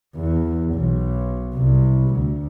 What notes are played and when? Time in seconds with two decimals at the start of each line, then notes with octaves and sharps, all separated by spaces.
0.15 E2
0.74 B1
1.55 C2
2.15 D2